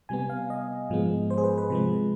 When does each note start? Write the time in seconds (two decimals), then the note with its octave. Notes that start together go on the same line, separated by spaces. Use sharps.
0.09 C3 G3 B3 G#5
0.30 F5
0.50 D#5
0.90 G#2 F3 G#3 B3
1.30 C5
1.38 G#4
1.44 B4
1.58 B4
1.70 C3 F3 G#3